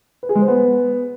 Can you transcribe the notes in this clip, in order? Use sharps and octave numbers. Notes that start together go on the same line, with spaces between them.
B4
G#4
G#3
C5
B3